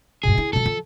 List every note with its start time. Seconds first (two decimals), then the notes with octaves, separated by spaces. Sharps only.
0.23 G2 B2 G#4
0.38 E4
0.53 B2 F3 A4
0.66 F3